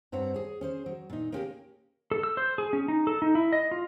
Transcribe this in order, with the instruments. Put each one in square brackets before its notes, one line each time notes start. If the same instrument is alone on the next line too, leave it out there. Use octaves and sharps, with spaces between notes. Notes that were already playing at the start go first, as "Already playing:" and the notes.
[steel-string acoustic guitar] G2 C4 C#5 F#5 A#5
G#4 C#5
C#4 G#4 C5
F#3
A#2 D#4
A#3 B3 C#4 G4 G#4 A#4
[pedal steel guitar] A4
E6
C5
G#4
C#4
D#4
A4
D#4
E4
D#5
F4